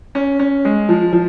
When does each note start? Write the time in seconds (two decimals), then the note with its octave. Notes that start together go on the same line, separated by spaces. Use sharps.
0.15 C#4
0.39 C#4
0.65 G#3
0.89 F3
1.13 F3